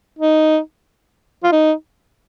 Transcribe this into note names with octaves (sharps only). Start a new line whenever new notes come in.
D#4
F4
D#4